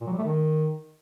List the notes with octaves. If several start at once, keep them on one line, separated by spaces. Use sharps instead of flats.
A#2
F#3
G3
A3
D#3